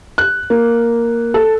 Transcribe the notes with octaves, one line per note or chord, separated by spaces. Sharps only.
F#6
A#3
A4